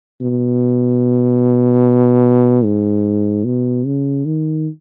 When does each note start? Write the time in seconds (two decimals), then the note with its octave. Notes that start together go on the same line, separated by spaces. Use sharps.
0.21 B2
2.64 G#2
3.45 B2
3.86 C#3
4.26 D#3